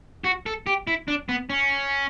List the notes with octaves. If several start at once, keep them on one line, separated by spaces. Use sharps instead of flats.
F#4
A4
G4
E4
D4
B3
C#4